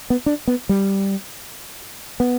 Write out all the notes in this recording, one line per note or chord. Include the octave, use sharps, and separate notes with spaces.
B3
D4
B3
G3
B3